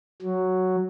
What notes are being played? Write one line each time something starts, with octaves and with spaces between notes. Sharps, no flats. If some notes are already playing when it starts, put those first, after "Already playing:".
F#3